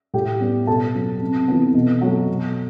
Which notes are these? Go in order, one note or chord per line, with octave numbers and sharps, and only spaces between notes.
A2 G4 G5
G3 B3
B2 A4 A5
F#3 B3
C3
E3 B3
B2
F#3 A3
B2